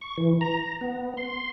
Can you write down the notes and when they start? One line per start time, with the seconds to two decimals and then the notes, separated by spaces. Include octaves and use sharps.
0.01 C#6
0.18 E3
0.41 A#5
0.81 B3
1.17 C6